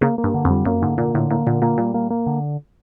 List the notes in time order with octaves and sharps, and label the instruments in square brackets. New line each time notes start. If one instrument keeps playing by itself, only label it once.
[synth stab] C#3 [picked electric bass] A#3
[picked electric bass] A#3
[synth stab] G2
[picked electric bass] D3
[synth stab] F2
[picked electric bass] G3
[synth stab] F#2 [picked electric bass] A#3
[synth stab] G#2 [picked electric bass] D3
[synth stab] A#2 [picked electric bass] A#3
[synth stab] A2 [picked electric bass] D3
[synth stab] A2 [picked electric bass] A#3
[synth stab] A#2 [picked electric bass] D3
[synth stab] A#2 [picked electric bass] A#3
[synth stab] A#2 [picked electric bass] G3
[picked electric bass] A#3
A#3
D3